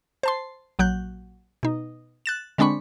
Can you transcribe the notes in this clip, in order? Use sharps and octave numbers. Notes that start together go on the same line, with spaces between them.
C5 A5 C6
A#1 F#3 F#6 G6
B2 D#4
F#6 A6 E7
D3 G#3 C4 D4 B5 C#6